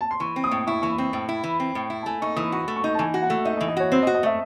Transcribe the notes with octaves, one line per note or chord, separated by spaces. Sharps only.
A5
C6
E3 C#6
C4
D#6
A2
E4 C#6
E3 C#6
C4
A2
E4
E3
C4
A2
E4
A5
A3 G#5
D#4 C#6
E3 D#6
F#4 C#6
A3
C#6
D#4
A5
E3 G#5
F#4
F#5
A3
D#4 E5
D#5
E3
D#5
F#4 C#5
C4 C5
D#5
F#4
D#5
A3 E5